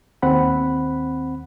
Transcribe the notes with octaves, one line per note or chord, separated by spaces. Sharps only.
D#2 C4 F#5 B5